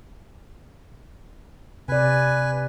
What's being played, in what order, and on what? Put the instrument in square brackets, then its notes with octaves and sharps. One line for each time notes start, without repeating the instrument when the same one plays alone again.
[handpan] C3 D5 [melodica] B4 G#5